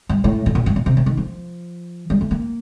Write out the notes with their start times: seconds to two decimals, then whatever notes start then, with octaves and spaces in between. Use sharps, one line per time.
0.09 G2
0.24 A2
0.46 A2
0.55 A#2
0.66 G2
0.76 A#2
0.86 C3
0.97 C3
1.06 D#3
1.17 F3
2.10 G3
2.21 A3
2.31 A#3